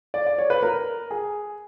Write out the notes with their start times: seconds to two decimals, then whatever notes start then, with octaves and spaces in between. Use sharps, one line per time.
0.14 D5
0.27 D5
0.38 C#5
0.50 B4
0.63 A#4
1.11 G#4